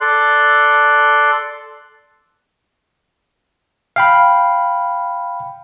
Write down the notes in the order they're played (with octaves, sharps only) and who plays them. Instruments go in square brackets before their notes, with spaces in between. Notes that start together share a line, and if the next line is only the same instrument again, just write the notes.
[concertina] A4 D5 C6 F#6
[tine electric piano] F5 G5 B5